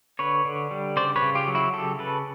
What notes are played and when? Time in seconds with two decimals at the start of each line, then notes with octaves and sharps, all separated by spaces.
0.19 D3 B4 C#5
0.45 D3
0.71 G3
0.96 C#3 C5 D5
1.16 B4 C#5
1.22 C#3
1.35 F4 G4
1.48 F#3
1.55 E4 F#4
1.74 C#3 G4 A4
1.99 C#3 A4 B4